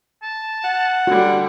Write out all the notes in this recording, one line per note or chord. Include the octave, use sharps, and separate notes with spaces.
A5
F#5
D3 G3 F#4